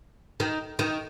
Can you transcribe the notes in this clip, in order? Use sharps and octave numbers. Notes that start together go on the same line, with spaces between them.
D#3
D#3